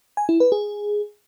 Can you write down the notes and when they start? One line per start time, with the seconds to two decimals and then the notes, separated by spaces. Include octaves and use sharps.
0.17 G#5
0.29 E4
0.40 B4
0.52 G#4